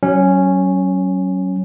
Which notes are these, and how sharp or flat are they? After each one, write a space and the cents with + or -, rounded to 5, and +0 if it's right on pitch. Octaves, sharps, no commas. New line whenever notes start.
F#3 +25 C#4 -5